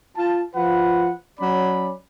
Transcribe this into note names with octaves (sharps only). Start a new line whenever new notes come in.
F4 A5
F3 F4 B4 F#5
F#3 C#4 D5 B5